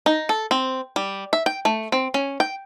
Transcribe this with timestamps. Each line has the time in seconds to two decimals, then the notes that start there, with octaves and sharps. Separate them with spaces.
0.06 D#4
0.29 A4
0.51 C4
0.96 G3
1.33 E5
1.46 G5
1.65 A3
1.92 C4
2.14 C#4
2.40 G5